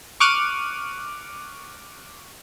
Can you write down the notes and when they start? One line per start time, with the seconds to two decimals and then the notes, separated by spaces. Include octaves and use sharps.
0.20 C#6 D6 F6 F#6 D#7